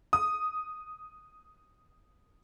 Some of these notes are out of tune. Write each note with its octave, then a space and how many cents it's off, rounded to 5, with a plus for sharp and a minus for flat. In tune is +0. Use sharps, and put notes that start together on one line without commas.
D#6 +0